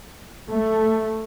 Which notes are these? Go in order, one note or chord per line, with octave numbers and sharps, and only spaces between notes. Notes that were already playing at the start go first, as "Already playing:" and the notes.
A3